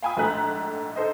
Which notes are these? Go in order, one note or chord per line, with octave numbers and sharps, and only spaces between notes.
F5 G5 G#5 B5 D#6
A#1 G#2 A3 A#5 F#6 B6
D#4 A4 C5 D#5